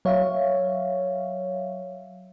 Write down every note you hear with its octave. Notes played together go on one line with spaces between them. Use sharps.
F#3 C#5 E5 F5